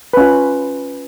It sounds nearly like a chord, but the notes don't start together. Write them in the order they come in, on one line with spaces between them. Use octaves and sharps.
B4 C#4 F4